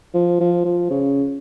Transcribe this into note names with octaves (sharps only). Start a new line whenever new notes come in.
F3
F3
F3
C#3